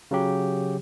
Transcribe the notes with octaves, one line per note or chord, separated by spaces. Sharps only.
C#3 F#3 G4